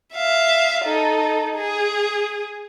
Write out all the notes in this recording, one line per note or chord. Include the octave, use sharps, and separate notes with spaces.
E5 F5
D#4 A4
G#4